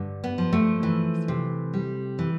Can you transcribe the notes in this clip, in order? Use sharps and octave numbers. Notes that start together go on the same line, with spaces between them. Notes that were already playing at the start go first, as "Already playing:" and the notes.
Already playing: G2 D3
B3
F3
A3
E3
C3
G3
E3